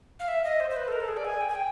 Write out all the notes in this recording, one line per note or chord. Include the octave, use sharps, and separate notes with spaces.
F5
E5
D#5
C5
C5
B4
A4
A#4
A4
G#4
D5
G#5
G5
G#5
G5